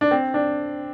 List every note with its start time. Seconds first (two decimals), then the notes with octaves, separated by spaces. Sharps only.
0.01 D4
0.11 C4
0.34 D4